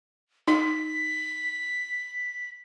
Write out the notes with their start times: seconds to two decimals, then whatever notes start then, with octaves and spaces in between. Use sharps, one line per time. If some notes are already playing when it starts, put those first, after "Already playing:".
0.48 D#4 B6